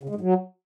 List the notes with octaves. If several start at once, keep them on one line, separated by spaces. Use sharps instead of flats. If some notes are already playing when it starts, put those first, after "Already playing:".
C#3
G#3
G#2
F#3